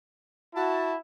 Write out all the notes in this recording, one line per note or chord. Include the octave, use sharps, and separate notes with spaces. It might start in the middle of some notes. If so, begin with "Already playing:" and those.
E4 F#4 A5